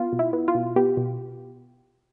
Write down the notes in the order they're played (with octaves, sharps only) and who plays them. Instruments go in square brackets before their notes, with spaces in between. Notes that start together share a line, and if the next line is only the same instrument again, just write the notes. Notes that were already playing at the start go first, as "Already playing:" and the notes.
Already playing: [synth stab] B3 F4
B2
E4
B3
F4
B2
B3 G4
B2